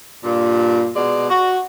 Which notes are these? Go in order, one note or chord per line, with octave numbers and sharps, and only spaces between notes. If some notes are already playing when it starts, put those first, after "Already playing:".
G2 A#2
B2 G#3 D5
F#4